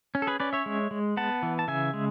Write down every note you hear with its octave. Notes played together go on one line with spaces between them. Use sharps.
C#4
A4
G#4 B4
C#4 B4 D5
C#5 E5
G#3
G#3
B3 F#5 A5
E3
A5
C#3 E5 G#5
G#3